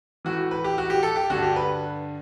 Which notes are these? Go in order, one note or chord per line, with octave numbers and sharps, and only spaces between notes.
A2 E3 F#4
B4
G4
F#4
G4
A4
G4
G2 D3 F#4
G4
B4